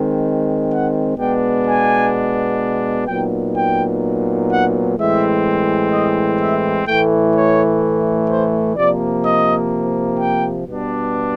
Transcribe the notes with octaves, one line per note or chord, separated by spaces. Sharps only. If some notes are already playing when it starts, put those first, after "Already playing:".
Already playing: D#3 G#3 C4
F#5
B2 G#3 B3 D4 G5
G#5
A#2 F#3 B3 D#4 G5
G5
F#5
A2 E3 G#3 C4 E5
D#5
E5
A2 E3 A3 G5
C#5
C5
C3 F3 A#3 D5
D#5
G5
B2 G3 B3 D4